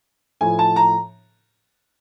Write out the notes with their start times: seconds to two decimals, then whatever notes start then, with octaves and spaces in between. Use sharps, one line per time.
0.41 A2 F3 G#5
0.59 A5
0.76 A#5